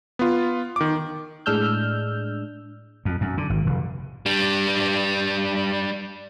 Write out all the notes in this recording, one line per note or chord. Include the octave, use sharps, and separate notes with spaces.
B3 F4
D#3 D6
A2 G#3 D4 E6 F6 G6
F2
F#2
D3
G#1
F1
G3 D4